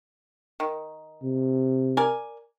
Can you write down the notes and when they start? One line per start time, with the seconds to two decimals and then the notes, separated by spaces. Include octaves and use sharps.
0.60 D#3
1.23 C3
1.97 A#4 D5 G#5